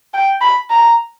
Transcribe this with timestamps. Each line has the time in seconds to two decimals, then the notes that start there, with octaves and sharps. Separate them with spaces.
0.14 G5
0.41 B5
0.70 A#5